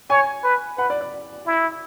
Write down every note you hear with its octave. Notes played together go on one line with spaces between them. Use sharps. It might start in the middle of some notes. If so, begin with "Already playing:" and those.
C#5 G#5
B4
B4 F#5
D5
D5
E4